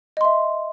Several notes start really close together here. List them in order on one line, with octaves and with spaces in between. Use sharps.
D#5 C6 E5